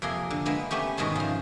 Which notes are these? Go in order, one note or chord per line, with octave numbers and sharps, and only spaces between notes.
F2 C3 A#3 G#4 C6
D3
G#3 A#3 B3 E5
A3 B3 C#4 G4
G#2 B2 D#3 G#3 C4 A5
C#3 F3